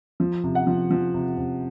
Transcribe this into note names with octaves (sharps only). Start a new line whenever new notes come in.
F3
C3
F#5
F3
F3
C3
C3